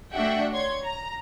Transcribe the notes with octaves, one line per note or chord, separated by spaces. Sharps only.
A3 D4 F#4 E5 F#5 G5
C#5 C6 G#6
A#5